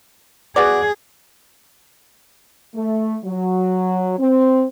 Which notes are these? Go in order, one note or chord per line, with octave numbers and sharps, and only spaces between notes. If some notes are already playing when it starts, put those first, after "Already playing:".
B3 F#4 G#4 D5
A3
F#3
C4